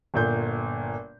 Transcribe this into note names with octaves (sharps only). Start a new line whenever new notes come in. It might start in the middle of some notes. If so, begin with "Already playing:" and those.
G1 A#2 G6